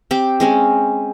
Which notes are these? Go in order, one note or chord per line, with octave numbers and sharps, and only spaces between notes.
C4 G4 D6
G#3 C4 C#4